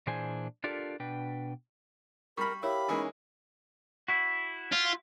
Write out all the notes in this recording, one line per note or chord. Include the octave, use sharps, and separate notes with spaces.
A#2 E3 D4 G#4 C5 G#5
D4 F4 G4 A4 A#4 D5
B2 D4 B4 G5
G3 A#4 B5 C#6
E4 G4 A#4 C#5 E5 F5 B5
E3 G#3 A#3 C#4 D#4
E4 F#4
F4